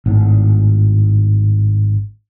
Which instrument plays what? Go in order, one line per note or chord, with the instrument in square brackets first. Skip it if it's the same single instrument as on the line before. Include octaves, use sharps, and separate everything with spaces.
[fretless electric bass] G#1 A2